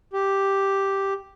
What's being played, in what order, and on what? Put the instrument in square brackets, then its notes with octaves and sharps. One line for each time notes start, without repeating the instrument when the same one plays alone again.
[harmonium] G4